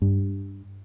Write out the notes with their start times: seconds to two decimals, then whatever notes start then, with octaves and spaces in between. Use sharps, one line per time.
0.02 G2